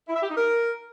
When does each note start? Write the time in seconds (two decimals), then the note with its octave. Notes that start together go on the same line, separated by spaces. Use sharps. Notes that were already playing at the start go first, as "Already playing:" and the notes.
0.08 E4
0.15 E5
0.22 G4
0.30 D#4
0.37 A#4